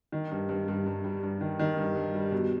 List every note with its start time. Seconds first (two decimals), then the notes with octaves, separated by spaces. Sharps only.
0.12 D#3
0.31 G2
0.49 G2
0.68 G2
0.86 G2
1.04 G3
1.23 G2
1.41 D#3
1.59 D#3
1.78 G2
1.95 G2
2.14 G3
2.32 B2